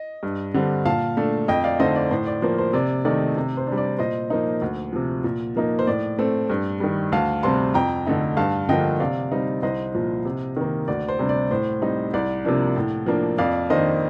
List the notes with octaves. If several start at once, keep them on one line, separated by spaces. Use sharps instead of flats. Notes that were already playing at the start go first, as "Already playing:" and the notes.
Already playing: D#5
G2
D3 G3 C4
A#2 F5 A5
A3 D4
F2 D#5 G5
D5 F5
D3 A3 C4 D#4 C5 D#5
D5
A2 C5
D5
F3 A#3 C5
C5
C3 D5
D#3 A3 D#4 D5
C3
C5
G3 D4
D5
A#2 C5 D#5
F3 A#3 D#4
D2
C3 F3
A#2
F3 A#3 D#4
C5
A2 D5
A3 C4
G2
D#3 G3
D2 F5 A5
C3 G3 C4 A5 C6
F2 G5 A#5
D3 A3 D#4
G2 F5 A5
D3 F3 A#3 D#5 G5
C3 D5 F5
G3 C4 D#4
C2 C5 D#5
A#2 F3
C3
D#3 A#3
D2 D5
C5
C3 G3 D4
D5
A2 C5
G3 C4 D#4
C2 D5
C3 F3 A#3 D4
A2
F3 A#3 D4
F2 D5 F5
D#3 A#3 D4 C5 D#5